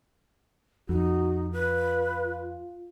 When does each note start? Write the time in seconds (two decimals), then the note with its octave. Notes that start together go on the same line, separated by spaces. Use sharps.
0.89 F2 D#4 F#4
1.53 F4 B4